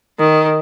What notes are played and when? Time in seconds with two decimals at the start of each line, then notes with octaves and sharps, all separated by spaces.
0.19 D#3